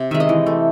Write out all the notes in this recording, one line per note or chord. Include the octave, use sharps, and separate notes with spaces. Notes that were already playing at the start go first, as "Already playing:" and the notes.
Already playing: C3
D#3 G#3 E5
D#5
E3
A3